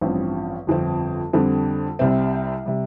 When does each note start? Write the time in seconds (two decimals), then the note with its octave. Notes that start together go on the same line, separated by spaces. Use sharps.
0.01 A1 G2 F3 C4
0.67 G1 F2 F3 C4
1.33 F2 D3 G3 C4
1.99 C2 C3 G3 C4
2.66 C3 G3